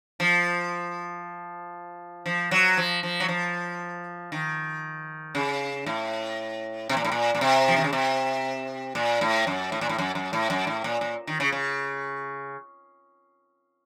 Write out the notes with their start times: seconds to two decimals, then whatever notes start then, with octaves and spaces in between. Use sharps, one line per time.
0.20 F3
2.26 F3
2.51 F#3
2.77 F3
3.03 F3
3.20 F#3
3.28 F3
4.32 D#3
5.35 C#3
5.86 A2
6.89 C3
6.97 A#2
7.04 A2
7.12 A#2
7.35 A#2
7.41 C3
7.68 F3
7.77 D#3
7.84 C#3
7.93 C3
8.95 A#2
9.21 A2
9.47 F#2
9.72 A2
9.81 A#2
9.89 A2
9.98 F#2
10.15 F#2
10.33 A2
10.50 F#2
10.67 A2
10.84 A#2
11.01 A#2
11.27 D#3
11.40 C#3
11.52 C#3